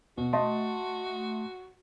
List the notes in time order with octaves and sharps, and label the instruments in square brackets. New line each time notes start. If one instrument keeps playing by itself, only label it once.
[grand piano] B2 [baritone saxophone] F#4
[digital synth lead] A3 [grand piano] D#5 A5 C6